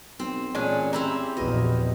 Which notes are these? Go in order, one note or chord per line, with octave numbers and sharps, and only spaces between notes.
B1 C4
A1 A#2 C#4 D4 G#4
C4 E4 G4 A#5
A#1 E2 B2 D#5